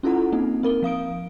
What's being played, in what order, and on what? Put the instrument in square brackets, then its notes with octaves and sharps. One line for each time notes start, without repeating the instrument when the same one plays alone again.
[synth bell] C#4 E4 F4 A4 F#5 A#5
A#3 C4 D#4
C4 A#4 G7
F3 F5 D#6 D7